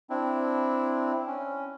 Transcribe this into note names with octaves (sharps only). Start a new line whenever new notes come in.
C4 D4 E4
C#4